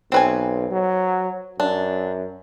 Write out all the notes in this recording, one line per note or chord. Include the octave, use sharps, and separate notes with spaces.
B1 C4 B4 G#5
F#3
F#2 D4